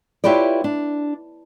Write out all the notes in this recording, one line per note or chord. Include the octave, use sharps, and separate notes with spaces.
E4 F4 G4 B4 C#5 D5
D4